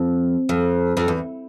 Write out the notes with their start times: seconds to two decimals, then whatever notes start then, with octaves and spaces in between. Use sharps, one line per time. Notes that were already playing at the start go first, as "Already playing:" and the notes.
Already playing: F2
0.49 F2
0.97 F2
1.08 E2